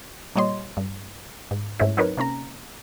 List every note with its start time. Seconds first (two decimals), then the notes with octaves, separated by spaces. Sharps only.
0.36 A#2 G3 C#5 D#5 C6
0.77 G2
1.51 G#2
1.80 G#2 A3 C#4 E4
1.97 F#3 C4 D#4 A#4 B4 C#5
2.17 C3 A#3 C#4 A#5